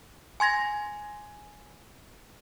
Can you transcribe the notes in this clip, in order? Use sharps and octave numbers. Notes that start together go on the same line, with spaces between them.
G#5 C6 G#6 A#6